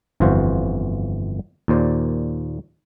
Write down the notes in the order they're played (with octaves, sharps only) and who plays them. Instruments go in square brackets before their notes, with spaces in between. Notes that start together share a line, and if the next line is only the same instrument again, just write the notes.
[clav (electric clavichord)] G1 F2 E3 F4 F#4 C5
D#2 A#2 C5 D5